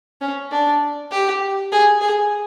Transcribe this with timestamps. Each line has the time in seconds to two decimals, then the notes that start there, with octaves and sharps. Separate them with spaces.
0.21 C#4
0.51 D4
1.11 G4
1.72 G#4
2.01 G#4